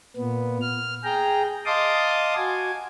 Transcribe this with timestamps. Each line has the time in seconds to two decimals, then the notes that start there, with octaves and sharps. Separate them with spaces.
0.17 A#2 B3
0.62 F6
1.04 G#4 G5 A#5
1.66 D#5 F5 A5 C6 D6 D#6
2.37 F#4 G#5